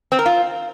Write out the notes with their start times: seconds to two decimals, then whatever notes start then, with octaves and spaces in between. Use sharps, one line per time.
0.12 C4
0.19 A#4
0.26 F4